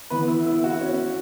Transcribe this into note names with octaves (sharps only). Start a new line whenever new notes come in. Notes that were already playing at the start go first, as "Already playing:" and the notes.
E3 B3 B4
E4
E4
F#4
C#4